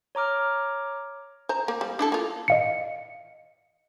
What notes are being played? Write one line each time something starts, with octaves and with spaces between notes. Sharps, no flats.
C#5 A#5 D6 F6
C5 A#5
A#3
G3
D4 E4 A4
A#3 F4
D#5 F5 C#7